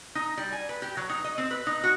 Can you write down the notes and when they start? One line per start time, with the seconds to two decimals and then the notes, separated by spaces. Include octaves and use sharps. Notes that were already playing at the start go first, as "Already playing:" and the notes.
0.15 D#4
0.37 G3
0.52 G#5
0.69 B4
0.82 G4
0.97 F#3
1.10 D#4
1.24 D#5
1.38 C4
1.51 B4
1.67 D#4
1.84 F#4